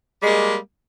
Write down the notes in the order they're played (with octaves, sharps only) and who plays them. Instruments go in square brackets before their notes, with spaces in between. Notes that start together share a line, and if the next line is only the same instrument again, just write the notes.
[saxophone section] G3
G#3
A#3